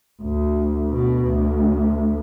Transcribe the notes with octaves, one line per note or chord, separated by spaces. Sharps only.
D2
B2
D2